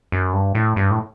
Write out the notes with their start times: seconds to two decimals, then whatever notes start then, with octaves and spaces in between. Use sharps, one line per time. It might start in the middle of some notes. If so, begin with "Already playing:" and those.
0.12 F#2
0.33 G2
0.55 A2
0.76 G2
0.91 A2